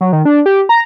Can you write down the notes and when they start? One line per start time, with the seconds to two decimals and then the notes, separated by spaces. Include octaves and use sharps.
0.01 F#3
0.13 D#3
0.25 D4
0.46 G4
0.69 A#5